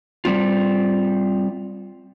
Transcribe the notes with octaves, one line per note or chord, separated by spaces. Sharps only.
G3 C4 F4